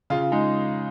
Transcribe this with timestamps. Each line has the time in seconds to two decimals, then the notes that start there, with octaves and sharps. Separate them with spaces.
0.10 C#3 F4
0.32 G#3 D#4